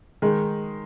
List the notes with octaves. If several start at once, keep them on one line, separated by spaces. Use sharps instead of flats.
D#3 G#3 D#4